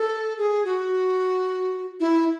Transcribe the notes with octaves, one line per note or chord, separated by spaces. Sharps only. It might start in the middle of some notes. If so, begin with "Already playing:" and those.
Already playing: A4
G#4
F#4
E4